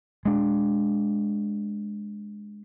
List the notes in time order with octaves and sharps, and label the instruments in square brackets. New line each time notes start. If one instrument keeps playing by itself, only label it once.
[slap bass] G#3 D4